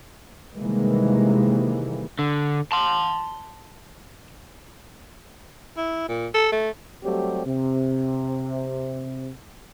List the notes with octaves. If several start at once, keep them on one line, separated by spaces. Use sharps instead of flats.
C3 D#3 E3 G3 G#3 A#3
D3
A5 C6
E4
A#2
A4
A3
F#3 G3 A3 C4 G4
C3